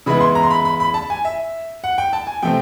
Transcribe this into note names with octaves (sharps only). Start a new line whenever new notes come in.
C#3 E3 G#3 B3 E4 B5
C6
A#5
C6
B5
B5
B5
A5
G#5
E5
F#5
G5
A5
G#5
C3 F3 A3 C4 G5